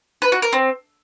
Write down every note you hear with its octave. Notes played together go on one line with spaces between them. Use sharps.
B4
F#4
A#4
C4